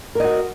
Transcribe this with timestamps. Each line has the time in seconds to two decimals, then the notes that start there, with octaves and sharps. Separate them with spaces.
0.15 A#4
0.20 D#5
0.24 F#4